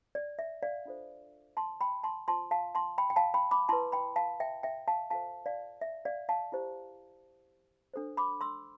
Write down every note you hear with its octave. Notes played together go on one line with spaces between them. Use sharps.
D5
E5
D5 F5
D4 F4 A4 C5
A5 C6
G5 B5
A5 C6
F4 C5 A5 C6
F5 A5
A5 C6
G5 B5
G5
F5 A5
G5 B5
B5 D6
E4 B4 A5 C6
G5 B5
F5 A5
E5 G5
E5 G5
F5 A5
F4 A4 C5 F5 A5
D5 F5
E5
D5 F5
F5 A5
E4 G4 C5
D4 A4 C5
B5 D6
C6 E6